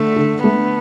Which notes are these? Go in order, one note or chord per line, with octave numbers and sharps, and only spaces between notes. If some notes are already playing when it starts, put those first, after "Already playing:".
Already playing: D3 A3
D3
A3 B3